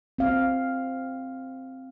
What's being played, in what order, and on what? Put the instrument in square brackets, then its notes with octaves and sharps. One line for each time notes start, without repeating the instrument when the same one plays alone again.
[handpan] C4 F5